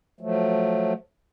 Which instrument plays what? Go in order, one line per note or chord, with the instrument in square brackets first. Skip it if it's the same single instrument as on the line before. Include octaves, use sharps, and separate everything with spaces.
[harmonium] F3 F#3 A3